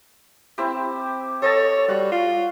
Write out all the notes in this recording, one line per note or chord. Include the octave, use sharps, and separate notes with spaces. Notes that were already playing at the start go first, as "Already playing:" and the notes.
C4 E4 G4
A4 C#5 D#5 A5
G3 F#4 C#6
F4